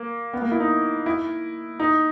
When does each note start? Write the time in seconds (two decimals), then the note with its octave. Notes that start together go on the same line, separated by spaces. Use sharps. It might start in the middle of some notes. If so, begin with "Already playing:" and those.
Already playing: A#3
0.33 B3
0.42 A#3
0.51 E4
0.60 D#4
1.06 E4
1.80 D#4